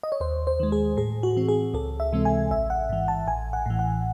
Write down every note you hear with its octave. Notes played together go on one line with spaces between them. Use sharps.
D#5
C#5
D#2 C5
C5
D#3 G#3
G#4
A2 G#4
F#4
E3 C4
G#4
C#2 A4
E5
C3 E3 G#3 C4
G#5
A1 E5
F#5
G#2 E3
A5
A1 G#5
F#5
A2 E3
F#5